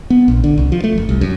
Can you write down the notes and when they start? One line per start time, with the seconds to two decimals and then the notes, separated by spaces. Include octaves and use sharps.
0.10 B3
0.28 A#1
0.44 D3
0.58 C2
0.72 F3
0.84 A3
0.98 F#1
1.09 C2
1.21 F#2